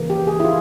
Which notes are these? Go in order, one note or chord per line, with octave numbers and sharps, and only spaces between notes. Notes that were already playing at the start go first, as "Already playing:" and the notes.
Already playing: C#3 E3 A#3
G4
G#4
E4
F4